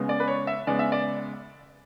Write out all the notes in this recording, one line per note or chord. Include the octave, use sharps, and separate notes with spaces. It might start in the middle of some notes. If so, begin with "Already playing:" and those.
Already playing: C#3 G#3 B3
D5
B4
C#5
E5
C#3 G#3 B3 D5
E5
D5